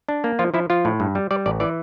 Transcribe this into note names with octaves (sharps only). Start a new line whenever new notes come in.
D4
A#3
F3 F4
F3 E4
F3 F4
A2
G2
G3
G3 D5
A1 D5
E3 D5